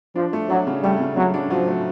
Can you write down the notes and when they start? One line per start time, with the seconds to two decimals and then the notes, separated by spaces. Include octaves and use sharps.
0.16 F3 D4
0.33 A3
0.49 F#3 D4
0.67 C#3
0.83 G3 A3
1.00 C#3
1.16 C#3 F#3
1.34 D4
1.50 F3 F#3
1.68 A3